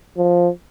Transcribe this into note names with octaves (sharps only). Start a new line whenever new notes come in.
F3